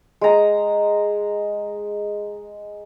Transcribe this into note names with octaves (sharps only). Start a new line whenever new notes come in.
G#3 A#5